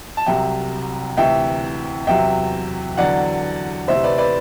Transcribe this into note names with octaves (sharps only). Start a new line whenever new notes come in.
A5
C2 C3 F#3 E5 G5
D2 C3 E3 E5 G5
E2 C3 F#3 E5 G5
E2 D3 F#3 D5 F#5
D2 C3 E3 C5 E5
B4 D5
B4 D5